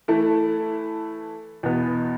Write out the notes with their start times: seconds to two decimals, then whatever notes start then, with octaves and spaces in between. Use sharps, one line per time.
0.08 E3 A3 E4 A4
1.63 E2 B2 B3